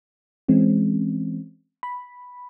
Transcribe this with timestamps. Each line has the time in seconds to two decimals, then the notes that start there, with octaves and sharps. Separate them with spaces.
0.48 E3 G#3 C4 C#4
1.83 B5